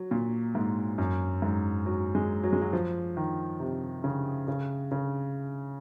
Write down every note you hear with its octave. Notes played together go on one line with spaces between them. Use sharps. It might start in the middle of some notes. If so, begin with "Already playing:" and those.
Already playing: F#3
A#2
G#2
F#2
G#2
F#3
G#3
F#3
G#3
F#3
F3
D#3
C3
C#3
C#3
C#3